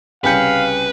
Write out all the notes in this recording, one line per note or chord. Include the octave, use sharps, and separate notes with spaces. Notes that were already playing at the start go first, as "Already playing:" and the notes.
C2 C#3 B4 F5 G5 G#5 G6 C#7